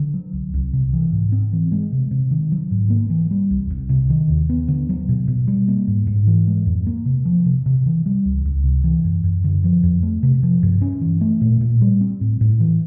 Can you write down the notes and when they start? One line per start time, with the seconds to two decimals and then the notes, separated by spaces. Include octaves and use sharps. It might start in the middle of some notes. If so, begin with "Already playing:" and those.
Already playing: D3
0.14 F#3
0.33 C2
0.54 C2
0.73 C3
0.93 E3
1.12 G#2
1.32 C4
1.53 E3
1.72 G#3
1.92 C3
2.11 C3
2.31 D#3
2.52 F#3
2.71 G#2
2.90 A#3
3.10 E3
3.31 G3
3.51 C2
3.70 C2
3.89 C3
4.10 D#3
4.29 D#2
4.49 B3
4.68 D3
4.89 F#3
5.09 B2
5.28 B2
5.48 G3
5.68 A#3
5.87 G#2
6.07 G#2
6.27 E3
6.47 G#3
6.66 F2
6.87 A#3
7.06 C3
7.25 F3
7.46 C3
7.66 C3
7.86 E3
8.06 G3
8.25 C#2
8.45 C#2
8.64 C3
8.84 E3
9.05 F#2
9.24 F#2
9.44 D3
9.64 F3
9.83 F2
10.03 A3
10.23 C3
10.43 F3
10.63 G2
10.82 C#4
11.01 E3
11.21 A3
11.41 A#2
11.61 A#2
11.82 G3
12.01 C4
12.21 A2
12.41 A2
12.60 E3